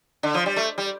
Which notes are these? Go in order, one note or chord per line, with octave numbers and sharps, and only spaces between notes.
D3
F3
G3
A3
G3